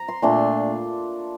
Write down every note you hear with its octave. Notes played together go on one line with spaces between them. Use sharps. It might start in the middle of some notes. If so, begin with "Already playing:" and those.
Already playing: A#5
C6
A#2 A3 D4 C6